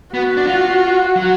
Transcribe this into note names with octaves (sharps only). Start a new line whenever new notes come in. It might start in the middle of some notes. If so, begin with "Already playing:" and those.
B3 F#4
D4
F4
F#3